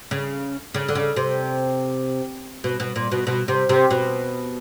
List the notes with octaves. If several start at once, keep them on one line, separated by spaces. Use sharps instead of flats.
C#3
C#3
D3
C#3
C3
B2
B2
A#2
B2
B2
C3
C3
B2